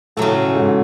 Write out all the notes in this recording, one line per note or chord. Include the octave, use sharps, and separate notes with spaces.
A2 C#3 F#3 A3
G#2